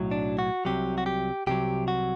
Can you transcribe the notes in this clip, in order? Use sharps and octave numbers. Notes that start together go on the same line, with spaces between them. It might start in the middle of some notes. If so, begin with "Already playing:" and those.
Already playing: B1 A2 F#3
D4
F#4
C2 C3 F#3 G4
F#4
G4
C2 C3 F#3 G4
F#4